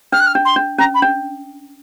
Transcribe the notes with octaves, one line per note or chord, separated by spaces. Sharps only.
D4 F6
F#6
F6
D4
C6
D4
C#4 A#5
B5
D4